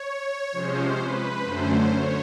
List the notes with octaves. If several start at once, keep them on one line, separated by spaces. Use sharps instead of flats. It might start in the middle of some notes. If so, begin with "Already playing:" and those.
Already playing: C#5
C3 F3 G#3 C#4 C5
B4
F#2 D3 F#3 A3 C#4 C5
C#5